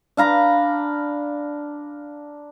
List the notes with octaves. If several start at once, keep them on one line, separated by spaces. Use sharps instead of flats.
D4 F5 A#5 B5